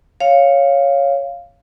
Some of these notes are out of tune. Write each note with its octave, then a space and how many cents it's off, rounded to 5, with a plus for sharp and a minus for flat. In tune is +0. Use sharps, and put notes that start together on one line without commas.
C#5 +0 F5 +0